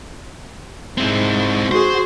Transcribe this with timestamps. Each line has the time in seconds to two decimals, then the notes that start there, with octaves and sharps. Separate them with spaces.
0.98 G#2 C4 E4
1.72 F#4 G#4 C5